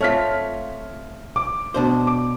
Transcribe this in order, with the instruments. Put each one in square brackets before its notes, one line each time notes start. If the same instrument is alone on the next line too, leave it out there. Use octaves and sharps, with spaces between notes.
[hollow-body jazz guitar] A3 C4 F4 [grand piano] C#5 F6 B6
[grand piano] D6
[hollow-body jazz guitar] B2 D4 C5
[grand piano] D6